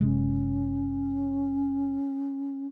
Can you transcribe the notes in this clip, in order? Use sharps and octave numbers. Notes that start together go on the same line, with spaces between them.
F#1 C3 G#3 C#4